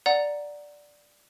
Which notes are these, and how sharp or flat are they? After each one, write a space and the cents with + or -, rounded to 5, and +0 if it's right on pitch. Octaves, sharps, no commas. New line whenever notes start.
D5 +0 F#5 +0 A#5 +0